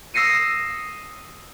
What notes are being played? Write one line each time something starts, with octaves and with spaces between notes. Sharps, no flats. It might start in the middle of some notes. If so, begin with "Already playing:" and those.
D#6 E6 A#6 C7 C#7 D#7